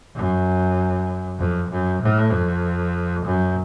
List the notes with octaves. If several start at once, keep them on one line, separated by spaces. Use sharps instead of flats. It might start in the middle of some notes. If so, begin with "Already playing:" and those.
F#2
F2
F#2
A2
F2
F#2